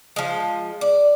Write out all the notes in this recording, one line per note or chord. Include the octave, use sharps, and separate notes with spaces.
F3 G#3
D5